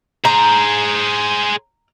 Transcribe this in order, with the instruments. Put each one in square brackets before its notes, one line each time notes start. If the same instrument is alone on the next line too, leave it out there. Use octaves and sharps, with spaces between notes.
[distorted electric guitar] G#4 C5 [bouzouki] A#5